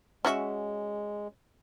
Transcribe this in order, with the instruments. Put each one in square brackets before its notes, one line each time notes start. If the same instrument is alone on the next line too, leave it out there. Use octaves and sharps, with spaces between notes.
[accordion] G#3 [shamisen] C#4 F#4 E5